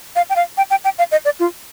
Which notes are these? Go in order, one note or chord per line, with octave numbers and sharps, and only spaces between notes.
F5
G5
F5
G5
G5
G5
F5
D#5
D5
F4